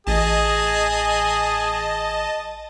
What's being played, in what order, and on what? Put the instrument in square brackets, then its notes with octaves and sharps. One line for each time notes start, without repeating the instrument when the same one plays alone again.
[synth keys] A1 [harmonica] G#4 [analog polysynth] D#5 A5